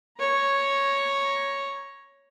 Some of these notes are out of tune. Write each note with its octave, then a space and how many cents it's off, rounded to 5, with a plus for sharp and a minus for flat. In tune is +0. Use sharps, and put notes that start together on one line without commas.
C#5 +0 A#5 +15